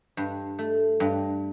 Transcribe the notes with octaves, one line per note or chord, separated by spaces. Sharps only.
G2
A3
G2